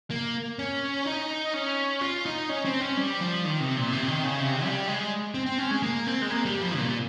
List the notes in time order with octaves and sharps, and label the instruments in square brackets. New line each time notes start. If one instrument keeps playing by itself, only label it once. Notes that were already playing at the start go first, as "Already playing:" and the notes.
[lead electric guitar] A#3
C#4
D#4
C#4
F4
D#4
C#4
C4
C#4
G3
F3
D#3
C3
A#2
C3
D#3
C#3
C3
G3
G#3
C4
C4
C#4
G#3
A#3
C4
G#3
A#3
G3
F3
A#2